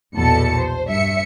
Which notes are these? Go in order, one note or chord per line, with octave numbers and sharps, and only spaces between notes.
A#1 E2 B2 A4 A5 C#7
C5
G2 E5 C#7